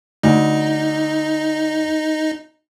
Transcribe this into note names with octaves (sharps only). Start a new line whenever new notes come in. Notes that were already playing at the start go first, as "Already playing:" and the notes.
D2 D#4